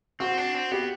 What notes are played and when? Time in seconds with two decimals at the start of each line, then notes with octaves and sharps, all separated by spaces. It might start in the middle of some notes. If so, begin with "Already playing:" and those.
0.20 C4 F#4
0.37 D4
0.54 C4
0.71 B3 G4